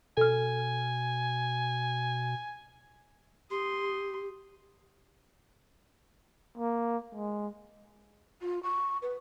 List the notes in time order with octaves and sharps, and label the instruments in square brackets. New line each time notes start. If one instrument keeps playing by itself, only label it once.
[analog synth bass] B2 [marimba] A4 F6 [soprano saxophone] G#5
[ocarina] G4 [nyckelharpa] C6 D#6
[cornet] A#3
G#3
[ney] F4
C#6
B4